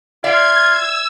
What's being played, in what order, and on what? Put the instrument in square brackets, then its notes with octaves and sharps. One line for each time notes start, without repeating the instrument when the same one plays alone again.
[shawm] F4 [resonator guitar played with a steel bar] D5 E5 F5 [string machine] G#6
[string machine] E6